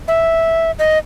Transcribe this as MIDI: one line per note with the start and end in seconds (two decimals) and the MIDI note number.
0.08 0.71 76
0.79 0.98 75